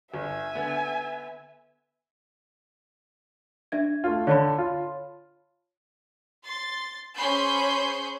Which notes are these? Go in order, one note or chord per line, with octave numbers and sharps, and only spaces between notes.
G1 E5 G#5
D3 B3
D4 E5 G#6
A3 F4
D3 C#5 A5 B5
F4
C6 A6
C#4 G#4 C5 B5 C6 G6